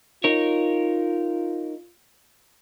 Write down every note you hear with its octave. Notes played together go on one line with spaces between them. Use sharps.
D#4 F4 A#4 C#5